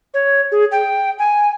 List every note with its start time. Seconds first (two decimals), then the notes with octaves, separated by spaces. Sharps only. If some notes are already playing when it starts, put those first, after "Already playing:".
0.14 C#5
0.52 G#4
0.72 G5
1.19 G#5